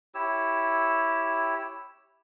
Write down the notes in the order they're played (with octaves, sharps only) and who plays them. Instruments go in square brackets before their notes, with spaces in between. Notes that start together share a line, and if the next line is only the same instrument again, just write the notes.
[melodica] E4 G4 C#5 E6